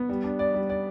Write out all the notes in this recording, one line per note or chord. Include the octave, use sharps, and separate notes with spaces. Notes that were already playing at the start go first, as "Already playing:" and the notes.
Already playing: B3
G3
D4
D5
G3
D5